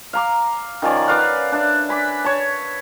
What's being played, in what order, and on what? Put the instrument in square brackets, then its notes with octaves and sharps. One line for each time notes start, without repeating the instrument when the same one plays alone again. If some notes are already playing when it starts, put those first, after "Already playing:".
[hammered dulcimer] F5 A#5 D6
D#3 F3 C#4 D5
B4 D5 F5 F#5
D4 E5
G#5 B5 D6
C#5 A5